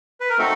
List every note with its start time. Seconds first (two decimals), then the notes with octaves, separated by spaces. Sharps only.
0.20 B4
0.29 A#4
0.38 A3 C4 D#4 F#4 A4